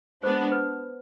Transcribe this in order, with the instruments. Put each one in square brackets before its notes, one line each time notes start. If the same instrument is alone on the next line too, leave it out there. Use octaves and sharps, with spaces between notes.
[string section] G#3 B3 D4 [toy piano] C5
[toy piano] B4